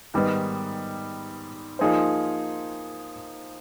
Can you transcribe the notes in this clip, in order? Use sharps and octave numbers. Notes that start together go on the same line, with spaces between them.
G#2 D#3 G3 B3 D#4
F3 A#3 D#4 G#4 C5